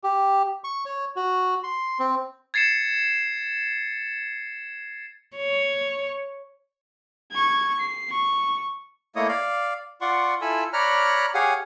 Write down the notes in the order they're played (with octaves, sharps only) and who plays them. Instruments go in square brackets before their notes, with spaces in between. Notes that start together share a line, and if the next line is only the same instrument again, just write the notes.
[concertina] G4
C#6
C#5
F#4
C6
C4
[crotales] G#6 A6 C7 C#7 E7
[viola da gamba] C#5
[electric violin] C#6 G#6
C7
C#6
[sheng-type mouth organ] A3 A#3 E4 C#5 D#5 D#6
D5 F5
F4 D5 F#5 C6 C#6
E4 F4 A4 G#5 B5 E6
C#5 D5 A#5 B5 F6 F#6
G4 G#4 C#5 F5 F#5 G#5